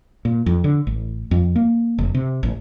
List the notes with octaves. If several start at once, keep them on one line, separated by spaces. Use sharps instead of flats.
A#2
F2
D3
A1
F2
A#3
F1
C3
A1